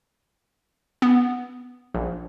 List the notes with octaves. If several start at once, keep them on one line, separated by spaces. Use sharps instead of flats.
B3
A#1